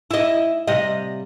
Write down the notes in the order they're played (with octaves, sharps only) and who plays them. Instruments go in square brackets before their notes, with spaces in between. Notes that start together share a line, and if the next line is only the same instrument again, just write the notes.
[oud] E4 D#5
C3 G3 D#5